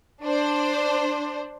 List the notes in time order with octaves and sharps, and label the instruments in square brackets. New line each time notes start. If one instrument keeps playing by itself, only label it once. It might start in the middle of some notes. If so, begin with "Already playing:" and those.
[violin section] D4 C5